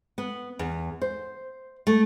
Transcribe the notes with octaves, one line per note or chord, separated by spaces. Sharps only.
B3
E2
C5
A3